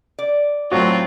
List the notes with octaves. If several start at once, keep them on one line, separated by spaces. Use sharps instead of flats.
D5
A2 F#3 C4 F4 F#4